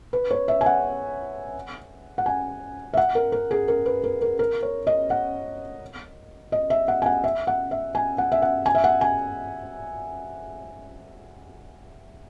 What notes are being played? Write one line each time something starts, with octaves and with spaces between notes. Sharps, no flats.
B4
C#5
E5
G#5
F#5
F#5
G#5
E5
F#5
A#4
A#4
G#4
A#4
B4
A#4
A#4
A#4
C#5
D#5
F#5
D#5
E5
F#5
G#5
F#5
E5
F#5
E5
G#5
F#5
E5
F#5
G#5
E5
F#5
G#5